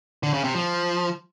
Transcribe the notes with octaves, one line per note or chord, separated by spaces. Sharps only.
D3
C#3
C3
F3